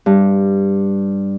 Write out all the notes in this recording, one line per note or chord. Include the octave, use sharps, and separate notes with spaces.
G2